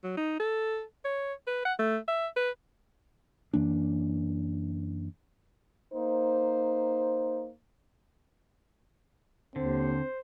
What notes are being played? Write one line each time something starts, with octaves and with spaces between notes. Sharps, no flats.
F#3
D#4
A4
C#5
B4
F#5
A3
E5
B4
F#2 E3 A#3 D4
A#3 D#4 C5
D#2 D3 C4 C5